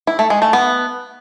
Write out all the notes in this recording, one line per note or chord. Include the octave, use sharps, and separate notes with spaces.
E4
A3
G#3
A3
B3